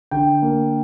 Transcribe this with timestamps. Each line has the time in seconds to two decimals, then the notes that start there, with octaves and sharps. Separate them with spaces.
0.11 D3 G5
0.42 A#3